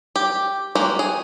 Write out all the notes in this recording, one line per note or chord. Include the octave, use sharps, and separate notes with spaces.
G4
G#3 A#3 F#4 G4
G#4